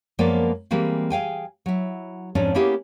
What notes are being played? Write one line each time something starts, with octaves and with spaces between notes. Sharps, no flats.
F#2 F3 G#3 A#3 B3 D5
E3 G3 G#3 A#3 C4
G#4 F5 G5 G#5
F#3 E4
F2 G#2 F3 C#4 D4
A#3 B3 C#4 E4 G4 G#4